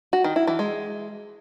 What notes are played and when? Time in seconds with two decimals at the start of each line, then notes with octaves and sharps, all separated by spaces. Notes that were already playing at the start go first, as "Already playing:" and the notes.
0.13 F#4
0.24 D#3
0.36 E4
0.47 E3
0.59 G#3